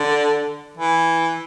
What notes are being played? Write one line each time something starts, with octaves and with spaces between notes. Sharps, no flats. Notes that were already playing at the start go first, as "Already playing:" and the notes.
Already playing: D3
E3